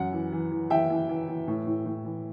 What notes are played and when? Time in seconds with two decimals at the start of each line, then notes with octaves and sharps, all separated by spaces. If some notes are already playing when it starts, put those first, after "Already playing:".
Already playing: F#2 F#5
0.13 E3
0.32 E3
0.51 E3
0.70 E3 E5 G5
0.90 E3
1.09 E3
1.28 E3
1.48 A2
1.67 A2
1.86 A2
2.05 E3